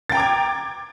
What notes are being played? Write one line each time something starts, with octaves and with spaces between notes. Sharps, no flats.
G5 A#5 D6 G#6 A6